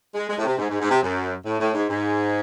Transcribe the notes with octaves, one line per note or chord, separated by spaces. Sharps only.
G#3
G#3
A2
C3
G#2
G#2
G#2
C3
F#2
A2
A2
G#2
G#2